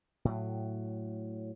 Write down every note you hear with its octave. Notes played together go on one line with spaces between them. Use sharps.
A2 F#3